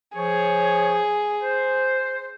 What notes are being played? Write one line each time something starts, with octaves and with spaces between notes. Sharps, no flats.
F3 G#4 C#5
C5